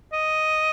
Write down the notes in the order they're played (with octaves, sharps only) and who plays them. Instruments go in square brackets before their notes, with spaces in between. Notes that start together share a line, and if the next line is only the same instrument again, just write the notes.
[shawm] D#5